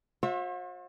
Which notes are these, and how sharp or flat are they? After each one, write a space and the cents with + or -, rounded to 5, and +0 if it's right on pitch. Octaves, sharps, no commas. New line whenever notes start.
F#4 -45 C5 +45 E5 +0